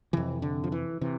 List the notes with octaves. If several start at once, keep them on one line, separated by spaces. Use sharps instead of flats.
F2 C3 E3
D3
F3
E3
C3 E3